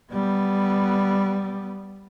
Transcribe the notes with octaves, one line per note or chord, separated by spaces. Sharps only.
G3 B3